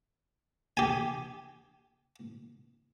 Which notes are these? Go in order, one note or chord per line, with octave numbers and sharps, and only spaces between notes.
G4 G#5